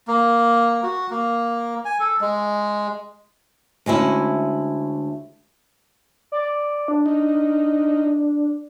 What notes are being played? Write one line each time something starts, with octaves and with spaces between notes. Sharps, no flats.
A#3
F#4
A#3
G#5
A4
G#3
D2 G#3 C#4 E4
D5
D4
D#4